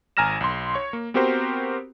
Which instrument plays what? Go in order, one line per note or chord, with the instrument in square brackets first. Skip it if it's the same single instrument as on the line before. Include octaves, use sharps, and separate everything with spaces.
[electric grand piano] G#1 G#5 A#5 F6 A#6 E7
B1 C6
C#5 C#6
A#3
B3 C4 F#4 G4 A#4 C5